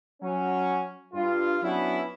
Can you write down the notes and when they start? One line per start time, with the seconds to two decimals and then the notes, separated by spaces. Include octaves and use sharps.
0.22 F#3 C#4
1.13 G2 F4
1.62 F#3 B3 C#4 D4 E4